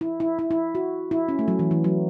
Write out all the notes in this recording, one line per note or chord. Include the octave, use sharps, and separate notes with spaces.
E4
E4
E4
E4
F#4
E4
C#4
A3
F#3
E3
E3
F#3